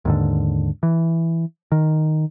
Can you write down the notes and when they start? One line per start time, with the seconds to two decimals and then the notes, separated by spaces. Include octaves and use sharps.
0.05 D#2 G#2 D3
0.83 E3
1.72 D#3